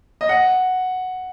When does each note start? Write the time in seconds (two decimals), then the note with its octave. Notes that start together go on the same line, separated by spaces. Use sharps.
0.21 D#5
0.29 F#5